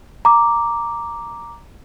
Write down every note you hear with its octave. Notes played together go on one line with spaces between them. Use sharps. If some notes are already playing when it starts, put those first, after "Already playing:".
A#5 D6